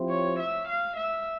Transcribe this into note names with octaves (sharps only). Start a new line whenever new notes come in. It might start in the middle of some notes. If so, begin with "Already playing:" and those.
Already playing: F3 C4 E4 G4 C5
C#5
E5
F5
E5